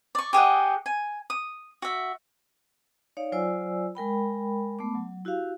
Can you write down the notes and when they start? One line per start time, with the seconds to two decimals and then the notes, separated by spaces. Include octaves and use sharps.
0.15 D5 C#6
0.33 G4 G#4 D#5 F#5
0.86 G#5
1.30 D#6
1.82 F#4 E5
3.17 D#4 C#5 D5 F5
3.32 F#3 F4 C5 D5 G#5 E6
3.95 G#3 A#4 G5 B5
4.79 A3 B3 D6
4.95 F#3
5.25 E4 F#4 G4 F5